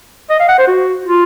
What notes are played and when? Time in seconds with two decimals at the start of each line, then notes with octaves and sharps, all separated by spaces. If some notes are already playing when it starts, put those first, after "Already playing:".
0.30 D#5
0.40 F5
0.48 F#5
0.59 C5
0.68 F#4
1.06 F4